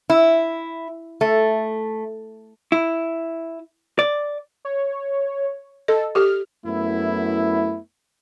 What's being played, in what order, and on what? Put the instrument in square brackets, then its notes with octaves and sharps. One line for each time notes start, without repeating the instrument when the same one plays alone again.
[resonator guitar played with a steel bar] E4
A3
[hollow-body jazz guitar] E4
D5
[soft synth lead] C#5
[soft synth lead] A4 [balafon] D#5
[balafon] G4 A4 [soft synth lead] F6
[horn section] F#2 A3 B3 E4